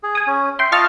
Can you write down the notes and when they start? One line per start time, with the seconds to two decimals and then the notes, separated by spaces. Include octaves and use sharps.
0.03 G#4
0.15 G#5 D#6
0.27 C#4
0.59 E5 G5 C6
0.72 F4 D#5 A5 C#6 F6 A6